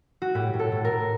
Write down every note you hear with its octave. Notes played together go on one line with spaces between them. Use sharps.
F#4
A2 G4
A2
A4
A2
A#4
A2